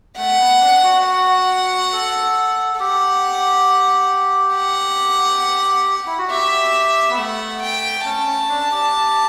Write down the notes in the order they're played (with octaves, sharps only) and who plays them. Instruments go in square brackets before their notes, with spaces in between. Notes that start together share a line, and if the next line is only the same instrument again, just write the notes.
[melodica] A3 [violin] F#5
[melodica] B3
D4
F#4
[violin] F#5
[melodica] A4
A4
[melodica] G4 [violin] F#5
[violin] F#5
[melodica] E4
F#4
[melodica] G4 [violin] E5
[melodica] B3
[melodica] A3 [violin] F#5
[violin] G5
[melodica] C#4 [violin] A5
[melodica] C#4
D4
G4